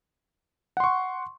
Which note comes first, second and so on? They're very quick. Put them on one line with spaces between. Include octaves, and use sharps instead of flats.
F#5 C6 C#6